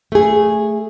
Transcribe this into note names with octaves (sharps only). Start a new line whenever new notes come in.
A3 G#4